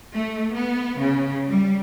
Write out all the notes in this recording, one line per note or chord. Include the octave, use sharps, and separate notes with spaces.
A3
B3
C#3
G3